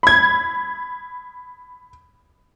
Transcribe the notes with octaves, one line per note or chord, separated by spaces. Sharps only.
B5 G#6